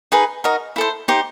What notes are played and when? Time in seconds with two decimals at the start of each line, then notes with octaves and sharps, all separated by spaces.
0.12 D#4 G#4 B4
0.44 D#4 F#4 A#4 D#5
0.76 E4 A4 C5
1.08 D#4 G4 C5